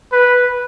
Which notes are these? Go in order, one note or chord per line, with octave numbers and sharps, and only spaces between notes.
B4